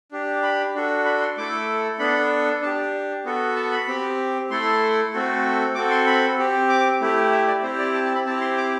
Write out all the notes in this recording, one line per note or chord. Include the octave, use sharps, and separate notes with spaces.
D4 G4
B5
D4 F#4 A4
B5
C6
A3 E4 A4 D6
B3 D4 A4 B5
D4 G4 A5
B3 F#4 A4
A5
B5
C4 G4
A3 E4 A4 C6
A3 C4 F#4 A4
C4 F#4 A4 D6
C6
B5
C4 G4
D6
A3 E4 G4
E5
D5
C4 E4 G4 C5
D5
A5
A5
B5
C4 E4 G4 A5
C6
D6